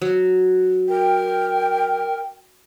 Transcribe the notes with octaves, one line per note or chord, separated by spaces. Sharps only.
F#3
A#4 G5